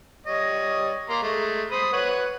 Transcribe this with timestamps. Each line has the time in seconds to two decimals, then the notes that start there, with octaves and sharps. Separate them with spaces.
0.26 G3 C#5 D#5
1.10 A#3 A#5 C6
1.23 G#3 A3
1.72 C5 B5 D#6
1.93 B4 C#5 F#5